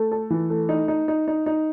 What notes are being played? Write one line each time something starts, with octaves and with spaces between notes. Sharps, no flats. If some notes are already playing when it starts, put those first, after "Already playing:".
Already playing: A3
A4
E3
A3
D#4
D#4
D#4
D#4
D#4